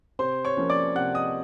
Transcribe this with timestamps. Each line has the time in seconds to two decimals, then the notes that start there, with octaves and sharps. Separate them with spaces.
0.19 C3 C5 C6
0.45 C#5 C#6
0.57 F3 A#3 C#4
0.70 D5 D6
0.95 C3 F#5 F#6
1.14 D#5 D#6